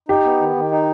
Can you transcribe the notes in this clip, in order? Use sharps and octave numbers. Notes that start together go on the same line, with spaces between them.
D#4 G4
B3
D#3
D#3
D#4